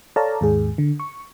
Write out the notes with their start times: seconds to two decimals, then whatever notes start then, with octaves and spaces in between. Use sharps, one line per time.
0.16 A4 C#5 D5 F5 A5 A#5
0.41 D#2 G#2 G#4
0.78 D3
1.00 C#6